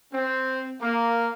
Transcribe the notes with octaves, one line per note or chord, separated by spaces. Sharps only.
C4
A#3